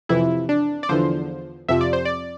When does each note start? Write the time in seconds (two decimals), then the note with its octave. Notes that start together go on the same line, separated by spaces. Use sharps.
0.09 F2 C3 E3 E4
0.49 D4
0.83 D5
0.89 E2 D3 F3 C5
1.68 F2 C3 F3 E5
1.81 D5
1.93 C5
2.05 D5